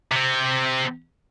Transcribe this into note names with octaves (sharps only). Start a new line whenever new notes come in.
C3 C4